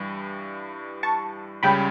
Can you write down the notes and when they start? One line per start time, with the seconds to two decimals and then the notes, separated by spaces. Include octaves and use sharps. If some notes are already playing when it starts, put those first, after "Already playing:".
Already playing: G2 E3 G3
1.03 A5 C#6
1.63 C#2 C#3 G3 C#4 G5 B5